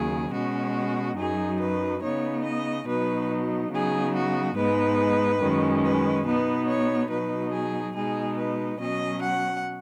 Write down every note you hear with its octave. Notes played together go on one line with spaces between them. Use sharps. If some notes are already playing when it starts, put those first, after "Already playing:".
Already playing: D#2 C#3 F#3 G#4
B2 G#3 C#4 F#4
F#2 F#3 D#4 G#4
B4
C#3 B3 D#4 C#5
D#5
B2 F#3 B3 D#4 B4
C#3 F#3 B3 D#4 G#4
F#4
G#2 G#3 B3 D#4 B4
F#2 D#3 G#3 C#4
B4
B2 B3 D#4 B4
C#5
B2 F#3 D#4 B4
G#4
B2 G#3 D#4 G#4
B4
B2 F#3 C#4 D#5
F#5